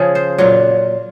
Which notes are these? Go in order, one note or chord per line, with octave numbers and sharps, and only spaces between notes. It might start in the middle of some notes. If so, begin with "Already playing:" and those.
Already playing: C#3 F3 G#4
C5
A#2 F#3 F4